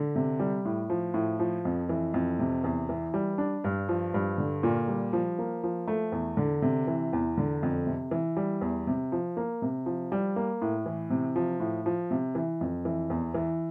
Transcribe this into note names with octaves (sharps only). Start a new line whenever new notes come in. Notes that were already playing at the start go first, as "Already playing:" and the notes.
Already playing: D3
C3
G3
A2
F3
A2
F3
F2
E3
F2
C3
E2
E3
G3
D4
G2
F3
G2
D3
A#2
G3
F3
A#3
F3
A3
E2
D3
C3
E3
E2
D3
F2
C3
E3
G3
E2
C3
F3
A#3
C3
F3
G3
A#3
A2
E3
C3
F3
A2
F3
C3
E3
F2
E3
E2
E3